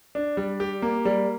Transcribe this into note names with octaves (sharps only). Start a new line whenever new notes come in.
D4
G3
G4
A#3
G3